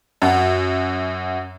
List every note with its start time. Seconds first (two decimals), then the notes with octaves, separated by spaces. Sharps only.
0.22 F#2 F#4